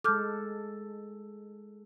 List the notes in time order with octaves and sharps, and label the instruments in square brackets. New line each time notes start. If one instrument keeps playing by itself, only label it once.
[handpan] G#3 A4 [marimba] D6 F6 G6